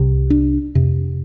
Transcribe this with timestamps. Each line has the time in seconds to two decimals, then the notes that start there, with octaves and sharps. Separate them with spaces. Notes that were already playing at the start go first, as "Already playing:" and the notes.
Already playing: C2 C3
0.30 D4
0.75 F2 C3